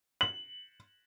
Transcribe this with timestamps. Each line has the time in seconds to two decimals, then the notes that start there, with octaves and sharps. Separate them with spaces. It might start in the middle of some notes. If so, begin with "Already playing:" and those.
0.21 F#7